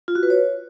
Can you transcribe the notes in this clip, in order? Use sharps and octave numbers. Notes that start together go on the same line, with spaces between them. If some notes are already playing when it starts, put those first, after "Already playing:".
F4
F#4
B4
C#5